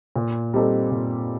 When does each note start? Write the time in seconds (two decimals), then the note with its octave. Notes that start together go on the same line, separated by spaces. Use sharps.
0.16 A#2
0.54 G3 C4 D#4 A4
0.91 A#2